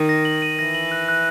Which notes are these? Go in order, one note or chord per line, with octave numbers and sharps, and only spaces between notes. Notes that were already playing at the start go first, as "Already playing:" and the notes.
Already playing: D#3
A#6
F#7
D#7
E3 A#6
F#7
F#6
F#6